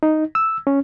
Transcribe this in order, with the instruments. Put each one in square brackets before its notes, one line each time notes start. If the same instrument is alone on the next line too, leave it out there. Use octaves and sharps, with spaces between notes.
[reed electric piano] D#4
E6
C#4